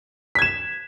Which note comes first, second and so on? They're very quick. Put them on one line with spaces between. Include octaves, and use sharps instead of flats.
B6 G#6 E7